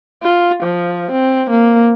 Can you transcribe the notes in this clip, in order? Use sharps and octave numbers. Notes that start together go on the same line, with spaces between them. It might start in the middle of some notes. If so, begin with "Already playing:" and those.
F4
F3
C4
A#3